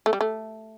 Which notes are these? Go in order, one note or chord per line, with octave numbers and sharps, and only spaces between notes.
A3
G3
A3